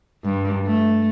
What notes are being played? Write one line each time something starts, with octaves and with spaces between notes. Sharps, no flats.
G2
A3